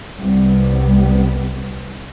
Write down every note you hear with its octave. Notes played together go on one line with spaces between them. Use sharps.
C2 C3 G3 B3